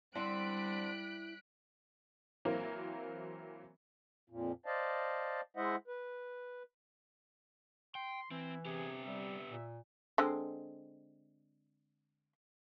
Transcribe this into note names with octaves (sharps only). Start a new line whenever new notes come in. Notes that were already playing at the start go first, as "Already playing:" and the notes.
D3 G3 C4 E4 F#6 B6 D7
E3 F#3 A#3 C4 A#4
F2 A#2
C5 D5 D#5 F5 A5
G#3 E4 C5 D#5 E5 F#5
B4
G5 C6
E3 C4 E4
C3 B3 G4 G#4
G3 E5
A#2
D3 G#3 C4